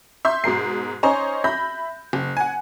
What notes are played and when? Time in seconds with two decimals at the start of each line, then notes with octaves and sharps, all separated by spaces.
0.25 E5 C6 G6
0.44 G#2 B2 A#4 C7
1.03 C#4 D#4 C5 C#5 D#5
1.44 E5 B5 G6 A#6
2.13 F#1
2.37 F#5 G#5